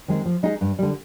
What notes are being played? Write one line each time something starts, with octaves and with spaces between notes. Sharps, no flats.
D#3 G#3 C4 D#4
F3
G#3 D#4 G#4
G2
D3 G3